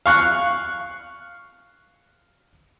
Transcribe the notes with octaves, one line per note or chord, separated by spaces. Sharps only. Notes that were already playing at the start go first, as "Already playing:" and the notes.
F5 C#6 F#6